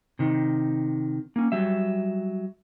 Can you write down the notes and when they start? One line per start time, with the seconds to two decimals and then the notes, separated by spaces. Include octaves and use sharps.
0.19 C3 D#3
1.36 A#3 C#4
1.52 F#3 G3 E5